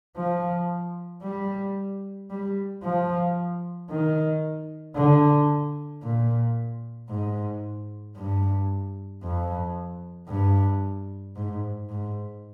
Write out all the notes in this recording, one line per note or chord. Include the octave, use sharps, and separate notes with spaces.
F3
G3
G3
F3
D#3
D3
A#2
G#2
G2
F2
G2
G#2
G#2